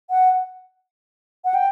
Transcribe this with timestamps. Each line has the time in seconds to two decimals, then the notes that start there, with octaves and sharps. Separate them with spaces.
0.10 F#5
1.45 F#5
1.54 G5